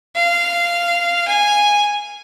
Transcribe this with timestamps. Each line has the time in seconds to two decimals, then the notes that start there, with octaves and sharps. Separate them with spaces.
0.15 F5
1.28 G#5